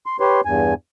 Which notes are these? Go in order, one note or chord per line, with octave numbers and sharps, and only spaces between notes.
C6
G4 B4 C#5 C6
E2 G2 G#5